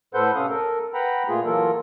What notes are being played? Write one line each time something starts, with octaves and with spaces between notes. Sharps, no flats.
A2 A4 B4 C5 F#5 G6
C3 C#4 A4 F5 D#6
A4 A#4
B4 F#5 G5 A#5 B5
A#2 A3 A#3 F4 G#4
E3 F#3 A#3 F4 A4 A#4